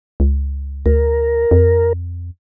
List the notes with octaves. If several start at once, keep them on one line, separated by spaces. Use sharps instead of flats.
C#2
D2 A#4
F2